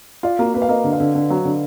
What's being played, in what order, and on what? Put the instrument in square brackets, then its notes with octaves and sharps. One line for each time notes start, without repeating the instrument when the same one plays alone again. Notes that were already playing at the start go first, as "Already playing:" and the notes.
[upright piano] F4 [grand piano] D5
[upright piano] A#3 [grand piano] F#4
[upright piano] A#3 [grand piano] B4
[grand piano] F5
[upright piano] A#3 [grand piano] D#5
[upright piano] D3
[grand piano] F5
[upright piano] D3
D3
F#3
D3